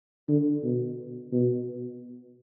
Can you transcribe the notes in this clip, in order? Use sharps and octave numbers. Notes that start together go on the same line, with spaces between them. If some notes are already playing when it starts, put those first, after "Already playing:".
D3
B2
B2